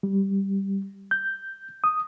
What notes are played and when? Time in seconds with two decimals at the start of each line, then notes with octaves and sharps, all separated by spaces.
0.03 G3
1.11 G6
1.84 D#6